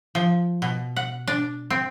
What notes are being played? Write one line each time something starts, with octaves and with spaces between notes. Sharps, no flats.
F3
B2
F#5
D4
C4